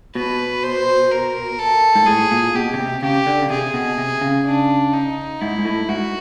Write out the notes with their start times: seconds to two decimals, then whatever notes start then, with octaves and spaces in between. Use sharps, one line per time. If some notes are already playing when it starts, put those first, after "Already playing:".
0.15 B2 B4
0.63 C5
1.11 A#4
1.59 A4
1.95 G#2
2.06 A2 G#4
2.31 A#2
2.55 B2 G4
2.74 B2
2.78 C3
3.02 C#3 G4
3.27 D3
3.42 C#3
3.50 C3 G#4
3.74 B2
3.98 C3
4.21 C#3
4.46 D4
4.93 D#4
5.41 G#2 E4
5.59 G#2
5.65 A2
5.89 G#2 F#4